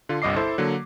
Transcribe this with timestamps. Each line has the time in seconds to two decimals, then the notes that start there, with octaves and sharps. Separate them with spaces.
0.09 D3 F4
0.22 G1 C2 G2 D#5 D6 C7
0.36 E4 A4 C5
0.58 D3 F#3 A#3